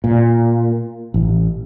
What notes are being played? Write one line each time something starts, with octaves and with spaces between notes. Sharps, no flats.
A#2
A1